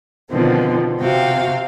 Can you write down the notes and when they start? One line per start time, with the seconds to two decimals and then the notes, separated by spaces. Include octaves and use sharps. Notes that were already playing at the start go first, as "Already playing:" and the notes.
0.31 B2 D3 D#3 F3 C4
1.00 C3 F#4 F5 G5